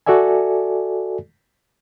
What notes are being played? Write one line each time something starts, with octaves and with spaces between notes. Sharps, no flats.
F#4 A4 D5 E5 G#5